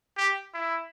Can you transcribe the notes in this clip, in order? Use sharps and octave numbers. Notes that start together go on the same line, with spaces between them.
G4
E4